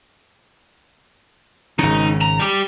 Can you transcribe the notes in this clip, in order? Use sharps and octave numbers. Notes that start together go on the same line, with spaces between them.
G#1 C#3 D#4
A#5
G3 G4